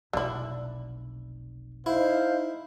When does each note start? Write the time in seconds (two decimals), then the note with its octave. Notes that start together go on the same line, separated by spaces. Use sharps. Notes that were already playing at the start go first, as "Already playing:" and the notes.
0.13 F1 B1 D3 E4
1.86 D#4 E4 C5 F5